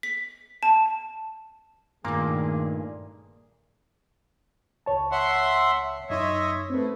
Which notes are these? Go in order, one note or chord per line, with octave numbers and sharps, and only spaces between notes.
B6
A5
G2 A#2 D#3 A3 A#3 F4 G#4 D6
C#2 C#5 A5
E5 F#5 C6
F#2 D#4 C#5 D#5 E5 C6
A2 C4 B4